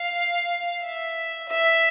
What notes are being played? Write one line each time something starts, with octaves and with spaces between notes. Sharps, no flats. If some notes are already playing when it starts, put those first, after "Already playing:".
Already playing: F5
E5
E5